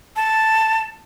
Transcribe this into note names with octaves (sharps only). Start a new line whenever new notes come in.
A5